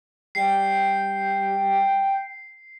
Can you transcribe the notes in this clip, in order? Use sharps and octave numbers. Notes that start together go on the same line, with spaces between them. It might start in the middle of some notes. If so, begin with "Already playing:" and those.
G3 G5 C7